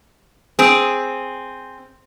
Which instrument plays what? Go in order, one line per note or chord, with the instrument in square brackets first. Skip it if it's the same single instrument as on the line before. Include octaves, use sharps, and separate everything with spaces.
[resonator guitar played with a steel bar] C4 G#4